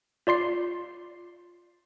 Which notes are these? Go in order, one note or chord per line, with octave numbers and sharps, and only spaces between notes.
F4 D5 C6 C7